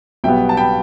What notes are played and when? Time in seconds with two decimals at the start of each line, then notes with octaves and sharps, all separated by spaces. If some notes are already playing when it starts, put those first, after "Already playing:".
0.24 B1 B2 G3 B3 E5 G5
0.49 A5
0.57 G5 B5